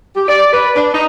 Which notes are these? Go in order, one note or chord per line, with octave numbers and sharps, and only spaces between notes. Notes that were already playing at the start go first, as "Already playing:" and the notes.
G4
D5
B4
D4
D#4